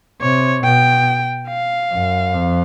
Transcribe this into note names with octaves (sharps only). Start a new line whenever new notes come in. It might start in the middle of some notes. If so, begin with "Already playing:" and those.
C3 C#5
B2 G5
F5
F#2
F2